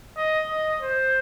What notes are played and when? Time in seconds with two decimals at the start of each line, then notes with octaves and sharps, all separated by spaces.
0.17 D#5
0.50 D#5
0.82 C5